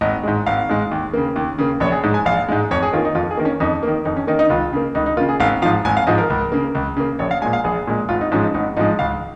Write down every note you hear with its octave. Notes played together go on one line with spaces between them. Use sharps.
G#1 D#5
G#2 G#3
G#1 F5
G#2 G#3
D#2
C#3 A#3
D#2
C#3 A#3
A#1 C#5
G#4
G#2 G#3
G#5
A#1 F5
G#2 G#3
F2 C#5
G#4
D#3 A#3 F4
D#4
F2 F4
G#4
D#3 A#3
C#4
F2 D#4
D#3 A#3
F2 D#4
C#4
D#3 A#3 D#4
D#4
C#2 F4
C#3 A#3
C#2 D#4
D#4
C#3 A#3 F4
G#4
G#1 F5
G#2 F3 F5
G#1 G#5
F5
G#2 F3 D#5
A#4
C#2
C#3 A#3
C#2
C#3 A#3
A#1 C#5
F5
A#2 G#3 G#5
F5
A#1 G#4
A#2 G#3
G#1 F4
D#4
G#2 F3 G#3 C#4
D#4
G#1 D#4
G#2 F3 G#3 D#4
C#2 F5